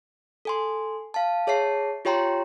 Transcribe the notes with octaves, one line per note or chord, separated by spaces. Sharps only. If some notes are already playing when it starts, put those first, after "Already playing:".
A4 G#5 C6
F5 A5
G#4 C#5 E5 A5 C7
F4 G4 C#5 G5 A#5 C6